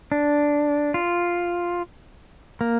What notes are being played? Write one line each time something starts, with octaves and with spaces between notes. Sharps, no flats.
D4
F4
A#3